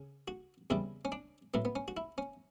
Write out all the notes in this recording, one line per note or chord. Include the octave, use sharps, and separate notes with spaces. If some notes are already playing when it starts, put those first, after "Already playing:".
Already playing: C#3
F#4
E2 C#3 G3 E4
C#4
D4
A2 F#3 A3 B3
B3
C#4
F#4
E4
C#4